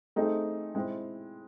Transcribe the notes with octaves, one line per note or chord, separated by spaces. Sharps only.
A3 C4 D#4 G#4
G#3 C4 E4